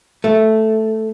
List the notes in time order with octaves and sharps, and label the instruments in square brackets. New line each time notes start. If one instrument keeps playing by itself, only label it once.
[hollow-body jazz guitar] A3